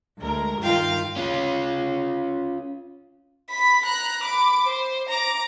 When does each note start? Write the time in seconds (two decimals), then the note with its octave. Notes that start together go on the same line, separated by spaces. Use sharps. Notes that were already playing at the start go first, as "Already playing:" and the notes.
0.18 D2 G#3 A#4
0.60 G2 D#3 F4 F5 G5
1.16 C#4 F4
3.50 B5 B6
3.85 A#5 F#6
4.23 B5 D6
4.67 C5
5.09 A#5 D6